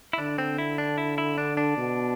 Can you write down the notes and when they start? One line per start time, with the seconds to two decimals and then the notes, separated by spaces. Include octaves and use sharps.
0.13 E4
0.18 D3 D4
0.38 C4
0.58 E4
0.78 D4
0.98 E4
1.18 E4
1.38 D4
1.57 D4
1.77 B2